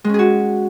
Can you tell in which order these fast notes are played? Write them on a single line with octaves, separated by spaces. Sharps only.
G#3 C#4 G#4 F#4